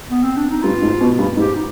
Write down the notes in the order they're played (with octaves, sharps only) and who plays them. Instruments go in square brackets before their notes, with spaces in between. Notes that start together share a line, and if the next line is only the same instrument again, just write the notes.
[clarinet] B3
C4
D4
D#4
[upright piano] G2 [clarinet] F4
[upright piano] G#2
B2
G2
[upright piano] G#2 [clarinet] G4
[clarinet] D#4